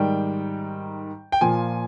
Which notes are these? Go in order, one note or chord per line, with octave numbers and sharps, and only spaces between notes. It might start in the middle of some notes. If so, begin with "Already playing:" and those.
Already playing: G#2 D#3 G3 G5
G5
A#2 F3 G#5